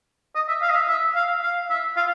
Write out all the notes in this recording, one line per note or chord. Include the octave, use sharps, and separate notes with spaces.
D#5
E5
F5
D#5
E5
E5
F5
F5
E5
F5